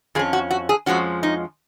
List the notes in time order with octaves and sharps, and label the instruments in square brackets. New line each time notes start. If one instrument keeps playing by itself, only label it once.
[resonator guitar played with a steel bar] F2 F3 C#4 G#4
F#4
F#4
G#4
F2 F3 G#3 C#4 F#4
D#4